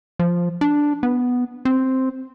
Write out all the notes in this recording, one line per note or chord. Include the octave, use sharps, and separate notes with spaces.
F3
D4
B3
C4